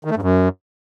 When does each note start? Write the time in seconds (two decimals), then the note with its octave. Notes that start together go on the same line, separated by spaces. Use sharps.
0.05 D#3
0.11 A3
0.16 G2
0.22 F#2